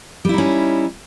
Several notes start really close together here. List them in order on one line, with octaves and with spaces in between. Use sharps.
G3 E4 D#4 C#4